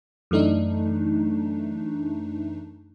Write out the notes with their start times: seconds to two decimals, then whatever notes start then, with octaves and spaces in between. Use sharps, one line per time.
0.31 F#2 E3 A3 D4 D#4